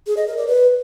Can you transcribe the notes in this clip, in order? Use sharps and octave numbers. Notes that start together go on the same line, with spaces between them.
G#4
D#5
A#4
D5
B4